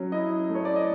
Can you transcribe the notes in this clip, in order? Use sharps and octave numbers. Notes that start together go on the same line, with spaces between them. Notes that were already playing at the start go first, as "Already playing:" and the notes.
Already playing: F#3 C#4
E4 D#5
A3
C#5
D5
D#5